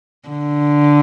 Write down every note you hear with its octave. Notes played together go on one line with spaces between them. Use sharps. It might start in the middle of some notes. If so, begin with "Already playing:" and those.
D3